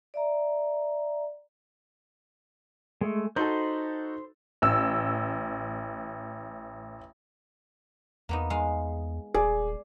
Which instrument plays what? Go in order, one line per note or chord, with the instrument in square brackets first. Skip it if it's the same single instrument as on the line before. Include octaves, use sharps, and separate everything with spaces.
[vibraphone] D5 E5 A#5
[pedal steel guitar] G#3 A3
[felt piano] D#4 F#4 A4 [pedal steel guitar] C5 B5 C6
[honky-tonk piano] A1 E6
[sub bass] E2 [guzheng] A#3 B3 D#4
[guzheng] G#3 F5
[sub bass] D#1 [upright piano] G#4 [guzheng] D5